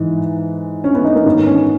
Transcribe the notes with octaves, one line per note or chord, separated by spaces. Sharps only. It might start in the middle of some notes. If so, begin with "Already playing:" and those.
Already playing: G#2 E3
C#4
B3
D#4
A#3
G#2 D#3 B3
C#4